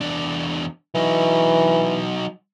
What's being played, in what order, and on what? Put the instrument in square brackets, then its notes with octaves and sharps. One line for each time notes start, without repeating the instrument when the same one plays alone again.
[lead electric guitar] E2 D4
[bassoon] E3 [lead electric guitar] F#3 D#4